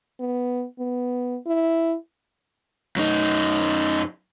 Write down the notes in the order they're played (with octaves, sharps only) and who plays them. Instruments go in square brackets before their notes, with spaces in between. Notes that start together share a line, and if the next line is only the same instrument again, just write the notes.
[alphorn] B3
B3
E4
[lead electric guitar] F#2 D#4